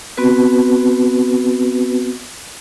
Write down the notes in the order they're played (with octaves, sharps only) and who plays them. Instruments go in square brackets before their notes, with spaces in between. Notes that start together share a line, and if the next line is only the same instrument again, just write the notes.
[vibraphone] B3 C4 F#4 B4